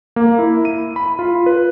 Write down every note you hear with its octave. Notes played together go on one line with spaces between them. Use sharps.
A#3
E4
D#7
B5
F4
B4